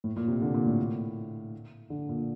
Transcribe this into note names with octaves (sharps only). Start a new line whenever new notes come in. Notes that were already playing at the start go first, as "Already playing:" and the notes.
A2
A#2
C3
D3
A#2
A2
D3
A#2